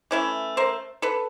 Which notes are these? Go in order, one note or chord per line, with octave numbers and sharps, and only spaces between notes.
E3 A3 C#4 E4
A#4 C5
A4 B4